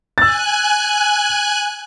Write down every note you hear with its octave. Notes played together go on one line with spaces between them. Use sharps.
G#5 E6 F#6 A6